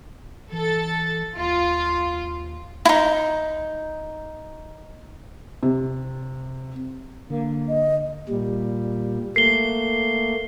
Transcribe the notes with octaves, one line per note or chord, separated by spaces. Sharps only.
E3 A4 A6
D#2 F4
D#4 E4
C3
D3 A#3
D#5
A#2 G3
A3 A#3 C7 G7